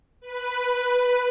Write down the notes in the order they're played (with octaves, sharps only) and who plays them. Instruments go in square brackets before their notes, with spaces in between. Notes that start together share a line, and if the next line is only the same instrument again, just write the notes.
[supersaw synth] B4